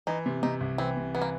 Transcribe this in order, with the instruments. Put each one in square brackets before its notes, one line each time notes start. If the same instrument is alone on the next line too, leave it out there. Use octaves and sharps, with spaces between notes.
[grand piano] E3 [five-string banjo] D#4
[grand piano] C3
[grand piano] C3 [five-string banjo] D#4
[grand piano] C2
[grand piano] E3 [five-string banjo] C4
[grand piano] C3
[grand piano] E3 [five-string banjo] B3
[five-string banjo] A#3